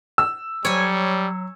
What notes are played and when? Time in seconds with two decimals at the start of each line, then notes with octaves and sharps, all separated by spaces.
0.18 E6
0.65 F#3 G3 C#5 G#5